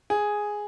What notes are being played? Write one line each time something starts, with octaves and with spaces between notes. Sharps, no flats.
G#4